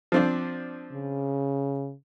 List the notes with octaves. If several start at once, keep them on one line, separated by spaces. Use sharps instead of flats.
F3 C4 D4
C#3